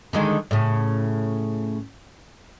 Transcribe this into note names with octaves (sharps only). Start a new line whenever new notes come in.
D3 D#3 G#3
A2 C#3